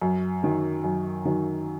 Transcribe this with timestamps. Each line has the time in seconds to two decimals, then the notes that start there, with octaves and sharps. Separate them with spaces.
0.02 F#2
0.43 D#3 F#3
0.84 F#2
1.25 D#3 F#3